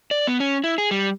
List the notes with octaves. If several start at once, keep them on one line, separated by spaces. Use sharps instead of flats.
D5
B3
C#4
E4
G#4
G3